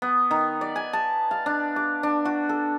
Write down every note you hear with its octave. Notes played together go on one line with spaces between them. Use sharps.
B3
D#3
D5
G#5
A5
F5
D4
D6
D4
F#4
A4